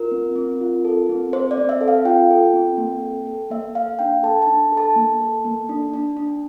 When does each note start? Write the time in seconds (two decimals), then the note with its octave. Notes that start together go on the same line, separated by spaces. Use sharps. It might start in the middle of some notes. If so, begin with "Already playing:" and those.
Already playing: F4 A#4
0.12 C4
0.36 C4
0.61 F4
0.85 A4
1.09 C4
1.33 C4 C5
1.51 D5
1.57 C4
1.69 E5
1.81 A4
1.88 F5
2.05 F4 G5
2.30 A4
2.54 C4
2.78 A#3
3.03 A4
3.27 A4
3.50 A#3 E5
3.75 A#3 F5
3.99 D4 G5
4.23 A4 A5
4.42 A5
4.47 D4
4.72 A4
4.77 A5
4.96 A#3
5.21 A4
5.45 A#3
5.69 D4
5.94 D4
6.17 D4